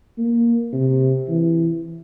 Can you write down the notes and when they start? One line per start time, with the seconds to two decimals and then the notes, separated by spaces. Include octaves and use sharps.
0.18 A#3
0.73 C3
1.28 E3